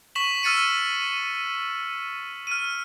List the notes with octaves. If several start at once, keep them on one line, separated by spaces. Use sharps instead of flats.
C#6 B6 E7 F#7
E6 F6 A6 C#7 D#7
F6 D#7